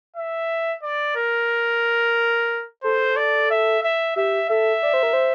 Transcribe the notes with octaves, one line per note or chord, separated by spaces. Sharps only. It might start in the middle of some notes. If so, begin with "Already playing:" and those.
E5
D5
A#4
A4 C5
D5
E5
E5
G4 E5
A4 E5
D5
C5
A#4
C5